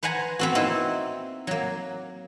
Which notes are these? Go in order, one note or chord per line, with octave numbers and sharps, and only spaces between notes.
B4 C5 F#5 G#5 A#5
B3 C4 F#4
A#3 C4 D#4 E4
F#3 A#3